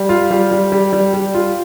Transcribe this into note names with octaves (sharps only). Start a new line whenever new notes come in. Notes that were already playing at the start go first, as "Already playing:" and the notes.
Already playing: G3
F4
G3
G3
G3
G3
G3
F4